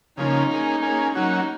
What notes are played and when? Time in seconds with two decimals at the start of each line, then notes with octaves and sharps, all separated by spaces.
0.17 C#3 F3 A#3 C#4 D#4
0.50 A#3 C#4 G#4
0.82 A#3 C#4 G#4
1.15 F#3 A#3 C#4 D#4 F#4